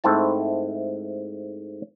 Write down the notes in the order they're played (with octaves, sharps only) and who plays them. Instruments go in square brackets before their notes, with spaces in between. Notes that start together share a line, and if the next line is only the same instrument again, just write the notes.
[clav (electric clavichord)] G#2 A3 C4 E4 A5